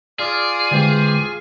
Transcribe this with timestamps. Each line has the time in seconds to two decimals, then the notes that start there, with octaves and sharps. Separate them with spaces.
0.19 F4 G#4 D5 F5
0.71 D3 E3 G#3 C4 G4